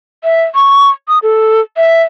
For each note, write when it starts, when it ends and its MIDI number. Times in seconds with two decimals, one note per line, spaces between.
0.24 0.43 76
0.55 0.89 85
1.08 1.18 87
1.23 1.61 69
1.77 2.03 76